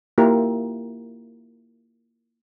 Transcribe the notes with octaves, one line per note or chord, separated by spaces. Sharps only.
A#3 E4 F4 G4 A#4